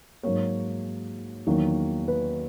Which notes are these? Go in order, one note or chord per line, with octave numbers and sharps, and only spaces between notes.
G#2 F#3 A#3 C#5
E2 D#3 F#3 A#3
B4